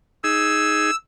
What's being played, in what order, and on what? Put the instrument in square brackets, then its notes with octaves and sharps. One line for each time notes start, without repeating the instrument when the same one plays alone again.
[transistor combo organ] D#4 G#4 [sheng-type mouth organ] E6